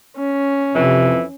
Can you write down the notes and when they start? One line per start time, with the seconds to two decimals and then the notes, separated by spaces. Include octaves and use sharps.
0.16 C#4
0.75 F2 C3 E3